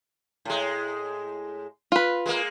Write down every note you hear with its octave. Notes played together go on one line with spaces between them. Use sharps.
A2 G#3
F4 B4
G#3 A#3